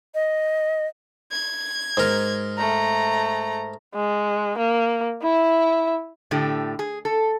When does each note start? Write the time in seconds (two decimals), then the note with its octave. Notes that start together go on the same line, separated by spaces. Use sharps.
0.14 D#5
1.32 G#6
1.97 G#2 A#4
2.58 A3 A#5
3.95 G#3
4.58 A#3
5.22 E4 E5
6.31 A2 D3 A3 G4
6.79 G#4
7.05 A4